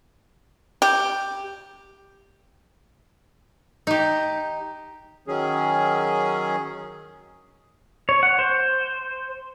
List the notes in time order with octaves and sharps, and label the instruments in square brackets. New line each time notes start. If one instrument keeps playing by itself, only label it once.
[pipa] G4
[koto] D#4 G4
[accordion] D#3 F#3 C#4 G#4
[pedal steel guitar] C#5
F#5
C5